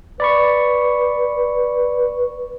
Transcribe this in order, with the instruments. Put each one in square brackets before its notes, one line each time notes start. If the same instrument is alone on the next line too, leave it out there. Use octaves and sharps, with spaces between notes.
[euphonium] B4 [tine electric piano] D5 B5 C#6